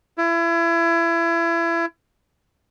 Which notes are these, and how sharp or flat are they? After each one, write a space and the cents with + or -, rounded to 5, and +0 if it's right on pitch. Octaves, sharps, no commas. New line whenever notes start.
E4 +30